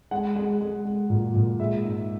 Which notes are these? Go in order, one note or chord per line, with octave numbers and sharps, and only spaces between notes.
G#3 F#5
G#3
G#3
G#3
A#2
A#2
G#3 E5
G#2